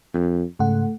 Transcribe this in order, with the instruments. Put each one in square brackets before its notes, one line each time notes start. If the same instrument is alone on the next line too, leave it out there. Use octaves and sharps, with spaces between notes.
[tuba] F2
[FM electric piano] G#2 C#3 F#5 [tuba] A3